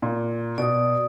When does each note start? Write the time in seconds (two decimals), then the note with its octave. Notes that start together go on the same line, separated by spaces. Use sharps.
0.02 A#2
0.58 B2 D5 D#6